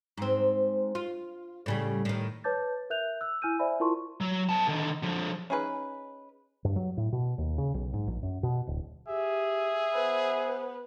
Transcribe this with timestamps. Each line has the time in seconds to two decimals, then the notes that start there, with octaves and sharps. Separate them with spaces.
0.17 G#2 C4
0.95 F4
1.66 A2 C#3 G3
2.05 A2 D#3
2.44 B4 C#5 A5 D6 G6 A6
2.90 A#4 E5 F#6 G6 F7
3.21 E6 F#6
3.42 E4 G#5 E6 F6 G6 D#7
3.59 C5 D5 E5 G#5 B5
3.80 E4 F4 A#4 A5 C6 C#6
4.21 F#3
4.49 B3 A5
4.67 D3 D#3
5.03 D3 F3
5.50 C#4 D#4 G#4 B4
6.65 G2
6.76 F#3
6.97 A2
7.13 B2
7.38 D#2
7.58 C#3
7.74 B1
7.93 G#2
8.07 A#1
8.23 F#2
8.43 B2
8.67 D1
9.08 G4 G#4 E5
9.93 B3 B4 C5